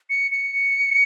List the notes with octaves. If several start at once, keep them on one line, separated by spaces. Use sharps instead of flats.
C#7
C#7